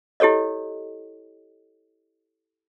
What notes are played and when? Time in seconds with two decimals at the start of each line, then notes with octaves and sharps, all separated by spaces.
0.20 E4 G4 A4 C#5 D#5